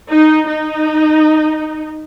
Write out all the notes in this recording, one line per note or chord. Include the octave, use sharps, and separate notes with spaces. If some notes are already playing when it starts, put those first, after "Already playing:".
D#4
D#4